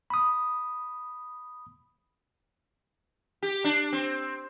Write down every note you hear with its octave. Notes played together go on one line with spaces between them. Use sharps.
B5 D#6
G4
D4
C4